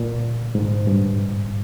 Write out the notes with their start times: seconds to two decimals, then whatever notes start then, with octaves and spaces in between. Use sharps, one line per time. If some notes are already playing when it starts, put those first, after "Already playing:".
Already playing: A#2
0.55 G#2
0.87 G2